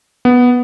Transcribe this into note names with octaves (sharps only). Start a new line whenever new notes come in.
B3